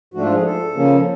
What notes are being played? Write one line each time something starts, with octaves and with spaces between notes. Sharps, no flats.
G#2 F3 A3 D4 F#4
F4
G#4
A4
C#3 F3 A#3 C#4